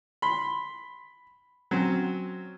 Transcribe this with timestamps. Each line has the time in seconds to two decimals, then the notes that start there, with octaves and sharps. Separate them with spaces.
0.22 B5 C6
1.71 F#3 C4 C#4